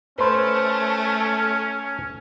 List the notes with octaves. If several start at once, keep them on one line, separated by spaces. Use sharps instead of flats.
A3 C#4 B4 C5